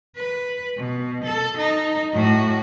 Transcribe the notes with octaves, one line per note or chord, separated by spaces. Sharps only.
B4
B2
A4
D#4
A2 F#4